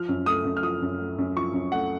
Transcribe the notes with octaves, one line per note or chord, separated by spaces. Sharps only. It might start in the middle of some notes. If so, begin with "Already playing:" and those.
Already playing: F3 F6
F#2
A3 D#6
F#2
F6
F3 D#6
F#2
A3
F#2
F3 C#6
F#2
A3 F#5